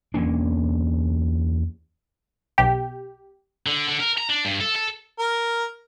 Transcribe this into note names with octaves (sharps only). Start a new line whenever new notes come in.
E2 A#3 C#4 D4
B1 G4
D3
D3
A#4
A#5
D4
G2
A4
A4
A#4